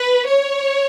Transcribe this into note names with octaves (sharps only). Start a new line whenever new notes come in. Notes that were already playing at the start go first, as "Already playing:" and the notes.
Already playing: B4
C#5